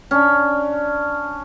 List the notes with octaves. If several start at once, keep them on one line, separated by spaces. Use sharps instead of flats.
C#4 D4